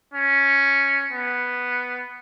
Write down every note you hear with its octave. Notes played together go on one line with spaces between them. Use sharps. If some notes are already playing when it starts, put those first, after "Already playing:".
C#4
B3